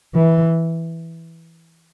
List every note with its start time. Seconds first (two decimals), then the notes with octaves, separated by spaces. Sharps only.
0.15 E3